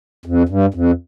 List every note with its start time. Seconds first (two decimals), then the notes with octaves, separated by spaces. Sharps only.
0.26 F2
0.49 G2
0.74 F2